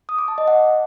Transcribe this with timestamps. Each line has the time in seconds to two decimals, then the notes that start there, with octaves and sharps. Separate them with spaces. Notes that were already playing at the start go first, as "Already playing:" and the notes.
0.09 D#6
0.18 D6
0.28 A5
0.38 D#5
0.48 F#5